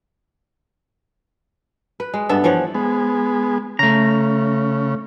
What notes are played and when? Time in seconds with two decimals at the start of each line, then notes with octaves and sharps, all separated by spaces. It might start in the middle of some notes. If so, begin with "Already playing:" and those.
2.00 B4
2.14 G#3
2.29 G2 B3 A4 E5
2.44 E3 F3 C#5 F#5
2.75 G#3 B3
3.79 C#3 A3 A#5